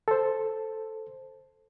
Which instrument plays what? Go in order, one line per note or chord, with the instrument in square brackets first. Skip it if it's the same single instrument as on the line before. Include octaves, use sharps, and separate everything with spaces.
[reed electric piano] A4 C5